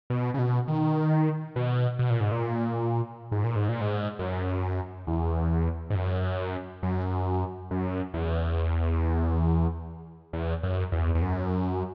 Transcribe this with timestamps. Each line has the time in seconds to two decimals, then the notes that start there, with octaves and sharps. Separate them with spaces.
0.10 B2
0.34 C#3
0.39 B2
0.68 D#3
1.56 B2
1.99 B2
2.10 A#2
2.20 G#2
2.32 A#2
3.32 G#2
3.44 A#2
3.56 G#2
3.69 A#2
3.81 G#2
4.19 F#2
5.07 E2
5.90 G#2
5.95 F#2
6.83 F#2
7.71 F#2
8.14 E2
10.33 E2
10.63 F#2
10.92 E2
11.15 E2
11.22 F#2